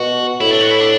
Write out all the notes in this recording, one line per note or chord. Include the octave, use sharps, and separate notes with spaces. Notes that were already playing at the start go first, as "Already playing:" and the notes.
Already playing: B2 F#4
A2 E4
D4
F#4
E4
D4